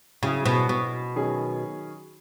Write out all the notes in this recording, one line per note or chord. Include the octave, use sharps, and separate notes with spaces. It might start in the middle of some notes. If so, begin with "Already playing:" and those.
C#3 F#3 C#4 E4 G#4
B2
B2
D#3 F#3 C#4 G#4